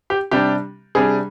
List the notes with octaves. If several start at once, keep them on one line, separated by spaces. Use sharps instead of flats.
G4
C3 G3 D4 G4
C3 G3 D4 G#4